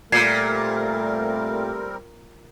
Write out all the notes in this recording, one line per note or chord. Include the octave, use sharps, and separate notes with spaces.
A#2 G3 A3 C4 A#4 G#6 C7